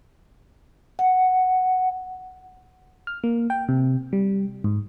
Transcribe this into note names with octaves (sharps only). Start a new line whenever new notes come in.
F#5
F6
A#3
G5
C3
G3
G#2